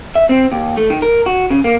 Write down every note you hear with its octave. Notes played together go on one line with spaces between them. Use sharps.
E5
C4
D#2
A3
D#3
A#4
F#4
C#3
A#3